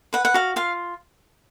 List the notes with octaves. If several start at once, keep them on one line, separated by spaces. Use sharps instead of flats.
B4 F#5
F#5
F#4 F5
F4 F5